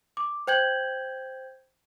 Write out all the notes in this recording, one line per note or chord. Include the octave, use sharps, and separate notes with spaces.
D6
C5 G5 G6 G#6 F#7